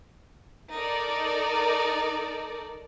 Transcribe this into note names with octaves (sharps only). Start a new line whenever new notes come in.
D#4 A4 A#4 D5